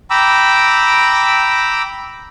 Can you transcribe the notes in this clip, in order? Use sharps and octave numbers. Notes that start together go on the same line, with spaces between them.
G5 A#5 B5 D6 E6